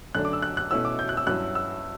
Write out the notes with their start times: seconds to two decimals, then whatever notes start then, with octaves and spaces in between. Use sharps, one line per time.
0.15 F#2 D3 A3 D4 F#6
0.25 D6
0.33 E6
0.42 F#6
0.57 F#6
0.71 B2 A3 C#4 E4 E6
0.85 D6
0.99 G6
1.09 F#6
1.17 E6
1.27 G2 F#3 C#4 E4 F#6
1.55 E6